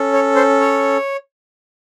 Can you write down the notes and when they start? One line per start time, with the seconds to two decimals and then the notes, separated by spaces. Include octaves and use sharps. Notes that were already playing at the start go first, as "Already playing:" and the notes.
Already playing: C#4 A4
0.13 C#5
0.36 C5
0.60 C#5